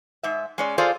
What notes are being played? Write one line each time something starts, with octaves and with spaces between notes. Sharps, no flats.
G#2 E5
G#3 C#4 D5
F4 G#4 A4 C5 D5 F5